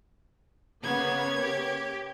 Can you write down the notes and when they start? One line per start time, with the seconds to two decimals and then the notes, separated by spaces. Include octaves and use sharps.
0.84 C#3 A#3 B3 C#5 G#6
1.42 G4